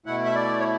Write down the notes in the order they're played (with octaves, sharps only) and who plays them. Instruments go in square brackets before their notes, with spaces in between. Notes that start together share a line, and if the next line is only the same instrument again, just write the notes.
[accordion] B2 A3 E4 F#5
E5
D5
C#5